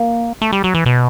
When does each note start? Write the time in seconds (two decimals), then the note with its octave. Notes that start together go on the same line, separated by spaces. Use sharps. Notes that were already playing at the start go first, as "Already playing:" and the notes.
Already playing: A#3
0.41 A3
0.52 G3
0.64 F#3
0.74 E3
0.86 B2